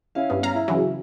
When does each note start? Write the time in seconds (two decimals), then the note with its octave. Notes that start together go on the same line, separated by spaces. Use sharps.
0.15 C#4 E4 F5
0.30 G2 B3
0.43 C#4 F5 A#5
0.55 E4
0.68 C#3 E3 F#3